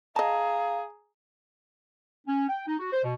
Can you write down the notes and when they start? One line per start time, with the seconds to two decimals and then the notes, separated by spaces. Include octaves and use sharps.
0.16 G#4 D#5 F5 A5 A#5
2.27 C#4
2.48 G5
2.67 D#4
2.80 F#4
2.93 C5
3.04 B2